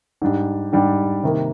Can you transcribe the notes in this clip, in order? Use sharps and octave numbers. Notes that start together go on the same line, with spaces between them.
G#2 G3 D4 G4
G#2 G3 D4 G4
C3 D#3 A#3